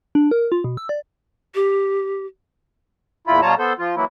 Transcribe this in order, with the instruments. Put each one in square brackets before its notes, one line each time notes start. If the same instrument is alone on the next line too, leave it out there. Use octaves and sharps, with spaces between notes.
[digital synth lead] D4
A#4
F4
B2
E6
D5
[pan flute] G4
[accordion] E2 A#2 E4 F4 B5
B2 G3 F4 C#5 A5 A#5
B3 A4 C5
F3 F4
E3 F#3 A#3 E4